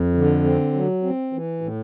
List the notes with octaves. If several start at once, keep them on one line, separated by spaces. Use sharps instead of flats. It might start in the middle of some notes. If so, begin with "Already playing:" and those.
Already playing: F2
D3
C4
F#3
C4
E3
A2